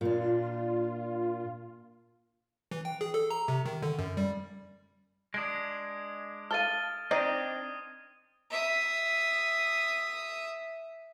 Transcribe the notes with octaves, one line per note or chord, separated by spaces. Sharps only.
A#2 D4 F4
E3
G5
G#4
A4
A#5
C3
D#3
D3
F#2
G3
G#3 D4 D#6 G#6 D7
A4 F5 F6 A6 D#7 G7
C4 D4 D#4 D5 D#5 D#6 G#6 D#7
E5 D#6